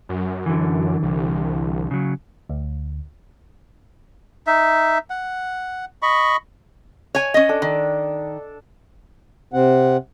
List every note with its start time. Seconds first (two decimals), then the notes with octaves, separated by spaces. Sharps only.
0.09 F#2
0.46 D3 E3
1.03 C2
1.91 C#3 F#3
2.49 D2
4.47 D#4 E5
5.10 F#5
6.02 D#5 B5 C#6
7.15 C#5 G#5
7.34 C#4 D#5
7.49 D4 A4
7.62 D#3
9.53 C3 C4 F#5